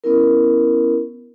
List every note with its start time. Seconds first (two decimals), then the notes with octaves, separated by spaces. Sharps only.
0.04 B3 C#4 E4 A#4